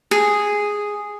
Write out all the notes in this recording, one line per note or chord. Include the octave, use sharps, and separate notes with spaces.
G#4